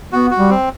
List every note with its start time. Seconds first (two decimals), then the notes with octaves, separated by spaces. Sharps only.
0.12 B3 F#4
0.31 F#4
0.37 G3
0.50 C4